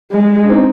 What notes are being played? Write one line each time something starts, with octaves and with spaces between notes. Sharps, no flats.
G#3
D4
C4 D#4